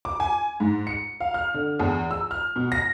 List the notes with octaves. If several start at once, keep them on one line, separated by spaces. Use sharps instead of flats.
D6
G#5
G#2
C#7
F5
F6
D3
E2
E6
F6
B2
A#6